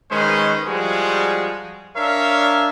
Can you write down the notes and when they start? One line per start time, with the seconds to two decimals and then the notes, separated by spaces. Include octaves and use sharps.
0.11 D#3 G#3 C#4 B4 C5
0.67 F3 G3 G#3 F#4 G#4
1.96 D4 A#4 C#5 E5 F5